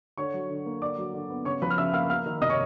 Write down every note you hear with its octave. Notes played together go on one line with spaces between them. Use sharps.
D3 C#5 C#6
F#3
D3
A#3
D3 D5 D6
F#3
D3
B3
C#3 C#5 C#6
F3 B4 B5
F6
C#3 E5 E6
A#3 F5 F6
A#3 F5 F6
D#3
C3 D#5 D#6
C#5 C#6